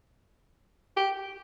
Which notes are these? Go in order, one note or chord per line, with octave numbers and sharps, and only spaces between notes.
G4